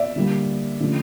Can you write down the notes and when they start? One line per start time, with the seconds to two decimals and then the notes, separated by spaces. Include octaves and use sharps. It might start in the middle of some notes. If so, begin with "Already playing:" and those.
Already playing: D5 E5
0.16 D3 G3 A#3
0.80 D3 F3 A3 C#4